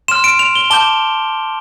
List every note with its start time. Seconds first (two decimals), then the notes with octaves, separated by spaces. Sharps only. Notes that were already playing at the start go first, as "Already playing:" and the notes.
0.08 C6 F6 E7
0.24 D7
0.39 F7
0.55 G7
0.70 A5 D6 G6 G7